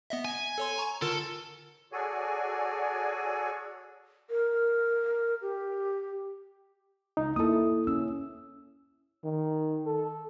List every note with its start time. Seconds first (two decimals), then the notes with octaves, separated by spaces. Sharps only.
0.10 B3 D#5 E5
0.25 G#5
0.58 A4 C#5 C6
0.78 A#5 C#6
1.02 D3 F4 A4 A#4
1.92 F#4 G#4 A4 C#5 D5 G#5
4.30 A#4
5.42 G4
7.17 C#2 D#4
7.36 A#3 E4 A4 D#6
7.87 C#4 E6
9.24 D#3
9.86 A4